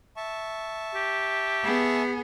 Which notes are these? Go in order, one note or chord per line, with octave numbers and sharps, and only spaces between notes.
E5 A5 C#6
G4
B3 G#4